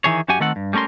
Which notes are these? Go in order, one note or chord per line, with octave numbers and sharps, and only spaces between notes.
D#3 E3 G#4 C#5
F#2 F#4 G4 F#5 G#5
D#3 A3 C4 A4 F#5
G2
G3 A3 C#4 A#4 C6